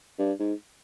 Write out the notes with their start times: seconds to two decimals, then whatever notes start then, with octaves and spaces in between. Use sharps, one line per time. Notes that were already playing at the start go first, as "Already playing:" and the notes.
0.18 G2
0.39 G#2